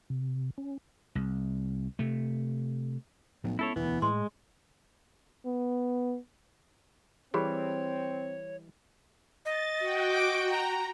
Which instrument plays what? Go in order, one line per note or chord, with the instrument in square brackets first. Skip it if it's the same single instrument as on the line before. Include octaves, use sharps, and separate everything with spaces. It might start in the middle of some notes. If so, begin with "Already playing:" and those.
[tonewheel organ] C3
C#4
[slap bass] C2
C3 A3
[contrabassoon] B1 [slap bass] A2 F3 B3
[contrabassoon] C#2 [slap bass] B3 [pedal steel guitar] E4 A4 C#5
[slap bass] E1 D2 [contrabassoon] E3 [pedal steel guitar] B3
[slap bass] A2 [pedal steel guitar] G#3 [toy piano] C6
[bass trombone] B3
[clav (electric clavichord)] E3 G3 [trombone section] C4 [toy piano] G4 G#4 B5 [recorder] C#5
[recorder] D#5 [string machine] A6
[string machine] F#4 G5
[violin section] D6 D7
A#5